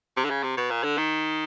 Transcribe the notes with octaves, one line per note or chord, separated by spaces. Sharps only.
C3
D3
C#3
C3
B2
A#2
D3
D#3